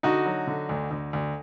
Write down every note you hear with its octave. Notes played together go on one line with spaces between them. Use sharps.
D3 D#4 F#4
F#3
D3
D2
D2
D2